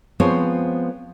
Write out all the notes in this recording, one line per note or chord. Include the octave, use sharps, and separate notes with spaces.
F3 G#3 B3 C4 C5 C#5